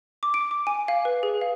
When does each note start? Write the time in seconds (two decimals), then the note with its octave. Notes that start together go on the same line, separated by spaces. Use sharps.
0.23 D6
0.34 D7
0.51 D6
0.67 G#5
0.88 F5
1.05 B4
1.23 G#4
1.41 F5